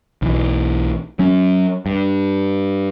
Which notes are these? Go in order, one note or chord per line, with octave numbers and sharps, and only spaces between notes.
B1 E3
F#3 C#4
G2